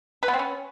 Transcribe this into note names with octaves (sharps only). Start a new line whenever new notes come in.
B4
B3
C4
C#4